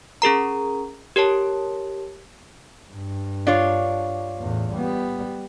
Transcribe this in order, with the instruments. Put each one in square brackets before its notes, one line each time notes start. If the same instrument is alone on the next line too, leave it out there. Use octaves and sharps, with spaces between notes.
[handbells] C#4 G#4 A#4 A#5
G4 A#4 C#5 A5
[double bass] G2
[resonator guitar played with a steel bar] D4 F4 C#5
[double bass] E2 A2
G3 B3